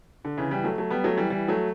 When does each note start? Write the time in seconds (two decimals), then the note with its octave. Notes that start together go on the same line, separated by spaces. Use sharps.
0.25 D3
0.37 C#3 E3
0.51 E3 G3
0.64 F#3 A3
0.78 F#3 A3
0.90 G3 B3
1.04 F#3 A3
1.17 E3 G3
1.30 E3 G3
1.48 F#3 A3